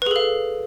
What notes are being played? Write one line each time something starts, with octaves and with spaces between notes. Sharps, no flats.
G#4 A4 B4 F5